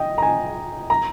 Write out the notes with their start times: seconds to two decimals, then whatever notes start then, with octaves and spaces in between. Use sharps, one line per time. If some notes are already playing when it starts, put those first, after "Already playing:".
Already playing: D#5 G5
0.18 A#5
0.22 G#5
0.90 A#5